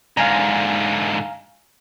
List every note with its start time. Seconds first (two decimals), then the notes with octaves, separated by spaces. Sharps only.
0.17 G#2 D3 F5 G#5 A#5